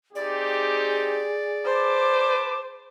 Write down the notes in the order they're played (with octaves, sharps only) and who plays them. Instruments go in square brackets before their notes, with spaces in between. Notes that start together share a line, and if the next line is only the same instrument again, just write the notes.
[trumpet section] C4 D#4 G4 [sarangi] G#4 [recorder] D5
[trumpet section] B4 A5 D6 [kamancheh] C5